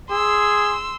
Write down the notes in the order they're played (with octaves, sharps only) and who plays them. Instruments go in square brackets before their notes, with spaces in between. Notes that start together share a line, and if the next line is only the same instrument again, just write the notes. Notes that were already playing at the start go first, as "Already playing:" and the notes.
[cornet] G#4 [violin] C6 E6